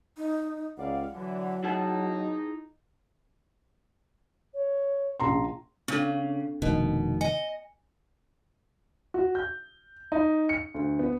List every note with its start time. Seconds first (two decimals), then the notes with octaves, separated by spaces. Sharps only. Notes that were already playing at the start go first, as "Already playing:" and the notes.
0.17 D#4
0.78 C#2 G4 D5 F5 F#5
1.14 D3 E3 F#3
1.64 D#4 E4 G#4 A5
4.54 C#5
5.20 A#1 C#4 A#5 C6
5.88 C#3 C4 D4 A4
6.62 F1 B2 D#3
7.21 D#5 G#5
9.14 F#4
9.35 G6
10.12 D#4
10.49 C#7
10.74 D2
10.99 B3